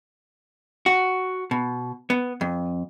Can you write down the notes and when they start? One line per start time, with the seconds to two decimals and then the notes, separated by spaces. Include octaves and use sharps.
0.86 F#4
1.51 B2
2.10 B3
2.41 F2